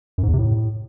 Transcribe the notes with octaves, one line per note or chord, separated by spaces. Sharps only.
F#2
G#2
E2
C3
A2